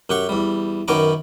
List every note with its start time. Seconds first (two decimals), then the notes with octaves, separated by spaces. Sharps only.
0.10 F#2 G4 F#5 C#6
0.29 E2 G3
0.88 F#2 D#3 B3 C#5 A#5 D6